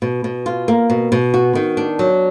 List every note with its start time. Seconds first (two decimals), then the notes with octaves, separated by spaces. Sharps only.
0.02 B2
0.24 B2
0.46 F4
0.68 A#3
0.90 B2
1.12 B2
1.34 F#4
1.55 D#3
1.77 D4
1.99 F#3